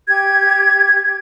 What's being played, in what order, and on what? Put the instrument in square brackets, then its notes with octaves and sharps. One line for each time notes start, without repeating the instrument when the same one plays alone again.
[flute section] G4 G#6